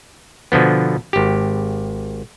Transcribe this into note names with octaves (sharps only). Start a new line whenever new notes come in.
B2 D3 F3 B3
G#1 G4